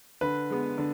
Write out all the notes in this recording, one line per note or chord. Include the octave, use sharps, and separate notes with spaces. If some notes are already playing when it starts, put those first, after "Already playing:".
D3 B4
G#3 B3
D3